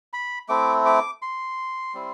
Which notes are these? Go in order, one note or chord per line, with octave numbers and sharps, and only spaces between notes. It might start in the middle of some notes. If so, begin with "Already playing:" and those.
B5
A3 C4 E4 D6
D6
C6
G3 C4 E4